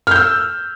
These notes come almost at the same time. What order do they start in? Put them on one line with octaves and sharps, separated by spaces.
F6 G6 E6